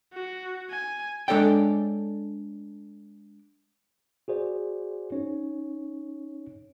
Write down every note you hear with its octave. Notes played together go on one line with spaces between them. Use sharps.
F#4
G#5
G#3 D4 A4 C#5 D5 G5
F#4 G#4 C5 D5
C#4 D#4 C#5